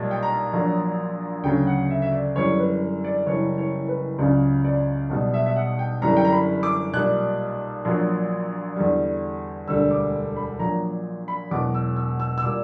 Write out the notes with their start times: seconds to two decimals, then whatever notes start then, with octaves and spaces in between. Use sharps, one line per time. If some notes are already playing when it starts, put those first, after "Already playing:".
Already playing: B1 A#2 G3
0.11 G5
0.23 A#5
0.53 A#1 A#2 F#3
1.43 D2 C#3 F#3 G5
1.67 F#5
1.90 E5
2.02 E5
2.12 D5
2.35 G1 F#2 E3 G3 C#5
2.59 B4
3.04 D5
3.27 F#1 F#2 E3 G3 C#5
3.58 C#5
3.88 B4
4.19 C#2 C#3 F#3 D5
4.65 D5
5.10 B1 B2 G3
5.34 E5
5.46 E5
5.56 F#5
5.79 G5
6.02 G1 F#2 E3 G3 A#5
6.17 G5
6.24 A#5
6.32 B5
6.63 D6
6.93 B1 A#2 G3 F#6
7.85 A#1 A#2 F#3
8.76 E2 D3 G3
9.68 E1 D2 D3 G3 E6
9.91 D6
10.36 B5
10.59 A#1 A#2 F#3 A#5
11.28 B5
11.51 E1 E2 B2 F#3 D6
11.74 E6
11.96 E6
12.20 E6
12.38 E6
12.43 A#2 G3 D6